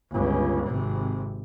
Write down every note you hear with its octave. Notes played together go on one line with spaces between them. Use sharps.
G1 C#2
G#1 C3